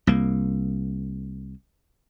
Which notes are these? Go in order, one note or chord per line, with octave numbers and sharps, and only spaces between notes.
C2 A#3